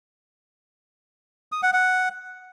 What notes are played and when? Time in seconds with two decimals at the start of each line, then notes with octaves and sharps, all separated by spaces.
1.52 D#6
1.63 F#5
1.73 F#5